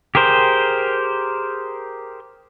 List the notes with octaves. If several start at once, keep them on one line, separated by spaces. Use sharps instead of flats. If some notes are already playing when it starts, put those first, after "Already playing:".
G4 G#4 A#4 C5